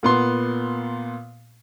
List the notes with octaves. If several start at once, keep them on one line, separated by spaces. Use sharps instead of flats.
A#2 B3 C6